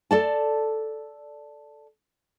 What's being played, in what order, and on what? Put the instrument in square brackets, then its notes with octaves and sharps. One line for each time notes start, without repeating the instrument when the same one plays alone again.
[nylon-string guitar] A4 D5 A5